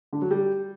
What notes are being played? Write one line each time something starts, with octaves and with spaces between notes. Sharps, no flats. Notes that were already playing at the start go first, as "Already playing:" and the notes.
D3
F#3
G3